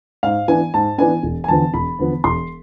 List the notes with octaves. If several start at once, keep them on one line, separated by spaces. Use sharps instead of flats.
G#2 F5
E3 B3 D4 G#5
G#2 A5
E3 B3 D4 G#5
E1
G#5
E2 D3 F3 B3 A5
E1 B5
E2 D3 F3 B3
E1 C6